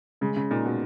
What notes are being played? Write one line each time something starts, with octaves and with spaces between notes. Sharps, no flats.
C#3 G#3
C#3
A#2 D#4
B2